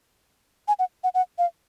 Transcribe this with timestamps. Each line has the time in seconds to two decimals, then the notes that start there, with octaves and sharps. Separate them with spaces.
0.68 G#5
0.79 F#5
1.04 F#5
1.14 F#5
1.38 F5